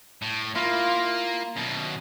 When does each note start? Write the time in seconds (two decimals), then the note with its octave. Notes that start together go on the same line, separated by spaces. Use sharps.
0.22 A2
0.55 A#3 E4 F4
1.57 F#2 B2